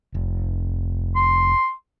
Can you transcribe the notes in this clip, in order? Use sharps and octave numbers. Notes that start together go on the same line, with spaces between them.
F1
C6